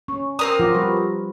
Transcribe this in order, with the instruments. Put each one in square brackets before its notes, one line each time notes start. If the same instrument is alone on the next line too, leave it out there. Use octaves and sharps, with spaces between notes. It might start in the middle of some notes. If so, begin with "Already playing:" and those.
[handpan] C#4 [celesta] C#6
[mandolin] C4 A#4 D#6 [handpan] D5 [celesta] A#5
[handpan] F3 F4 [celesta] F#5 D6 A#6
[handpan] G3 F#4 B4 [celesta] A#5 C#6 A#6